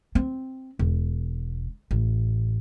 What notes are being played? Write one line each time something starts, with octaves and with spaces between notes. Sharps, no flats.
C4
E1
A1